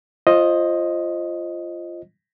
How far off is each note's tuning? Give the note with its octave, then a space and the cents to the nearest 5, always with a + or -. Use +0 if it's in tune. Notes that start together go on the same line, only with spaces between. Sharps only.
F4 -15 C5 +25 D#5 +0